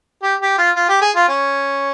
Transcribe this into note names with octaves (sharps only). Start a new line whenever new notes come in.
G4
G4
F4
F4
G4
G#4
F4
C#4